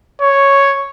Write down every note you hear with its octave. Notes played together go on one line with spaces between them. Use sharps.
C#5